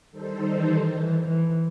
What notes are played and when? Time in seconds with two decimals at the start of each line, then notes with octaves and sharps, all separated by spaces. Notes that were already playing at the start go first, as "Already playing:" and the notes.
0.11 D#3 G3 D#4 A4 C5
0.55 E3
0.99 E3
1.28 E3